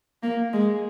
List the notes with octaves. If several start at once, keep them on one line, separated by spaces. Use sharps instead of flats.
A#3
G#3